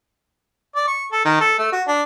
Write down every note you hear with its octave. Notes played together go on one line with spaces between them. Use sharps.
D5
C#6
A4
D#3
A4
A3
F#4
D4